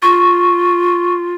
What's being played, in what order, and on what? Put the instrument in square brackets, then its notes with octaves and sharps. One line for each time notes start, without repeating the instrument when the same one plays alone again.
[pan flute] F4 [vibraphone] C#6